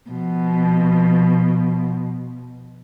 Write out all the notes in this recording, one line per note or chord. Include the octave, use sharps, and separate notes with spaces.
B2 F3